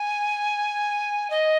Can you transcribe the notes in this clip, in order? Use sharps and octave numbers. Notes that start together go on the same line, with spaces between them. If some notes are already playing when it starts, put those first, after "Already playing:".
Already playing: G#5
D#5